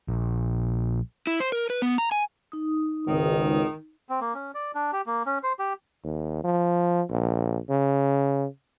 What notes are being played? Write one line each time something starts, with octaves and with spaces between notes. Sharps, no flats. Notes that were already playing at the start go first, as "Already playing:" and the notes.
A#1
E4
C5
A#4
B4
B3
A#5
G#5
D#4 D#6
G#1 C#2 D#3
C4
A#3
C#4
D5
D4
G4
A#3
C#4
C5
G4
D#2
F3
A#1
C#3